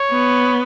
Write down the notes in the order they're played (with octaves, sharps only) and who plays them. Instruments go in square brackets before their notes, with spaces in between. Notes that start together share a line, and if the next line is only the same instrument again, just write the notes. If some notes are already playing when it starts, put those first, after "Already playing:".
Already playing: [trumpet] C#5
[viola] B3